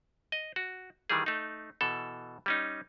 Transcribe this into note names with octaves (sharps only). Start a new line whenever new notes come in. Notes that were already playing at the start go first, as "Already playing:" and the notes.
D#5
F#4
D#3 E3 G3 G#4
A3 D#4
B2 E3 A4
G3 C#4 D#4